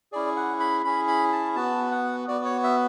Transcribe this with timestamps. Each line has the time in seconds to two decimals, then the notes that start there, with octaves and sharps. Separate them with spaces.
0.12 C#4 E4 G#4 D5
0.36 F#5
0.60 B5
0.84 C#4 E4 G#4 B5
1.08 B5
1.32 A5
1.56 B3 F#4 A5
1.91 F#5
2.28 B3 F#4 D5
2.45 C#5
2.64 E5